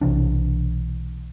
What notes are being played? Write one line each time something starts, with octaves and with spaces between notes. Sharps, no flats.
B1 C3 E3 D4